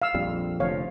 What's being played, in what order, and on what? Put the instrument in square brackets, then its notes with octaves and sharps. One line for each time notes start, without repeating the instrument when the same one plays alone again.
[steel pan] F5 E6
[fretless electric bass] A#1 F2 G3
[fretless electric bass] F1 D3 F3 [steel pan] C#5 F5